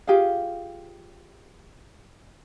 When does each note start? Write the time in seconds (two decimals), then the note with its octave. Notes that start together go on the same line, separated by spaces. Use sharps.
0.07 F4 G4 G#4 F5